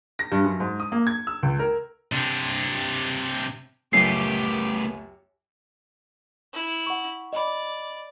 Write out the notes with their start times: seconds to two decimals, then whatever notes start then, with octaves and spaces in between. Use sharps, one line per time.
0.19 A#6
0.32 G2
0.44 F#2
0.60 G#2
0.80 D#6
0.92 A#3
1.07 G#6
1.27 E6
1.43 C#2
1.59 A#4
2.12 C3 D4
3.93 C#2 F#2 A3 B3 G4 D6 C7
6.53 E4
6.87 F#5 C#6
7.33 D5 D#5 B5